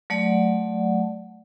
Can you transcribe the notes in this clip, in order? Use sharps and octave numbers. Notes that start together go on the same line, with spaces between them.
F#3 A3 D5 F#5